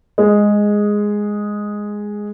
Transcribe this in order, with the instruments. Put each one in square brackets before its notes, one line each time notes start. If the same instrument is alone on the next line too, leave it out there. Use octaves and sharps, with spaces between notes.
[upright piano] G#3 G#4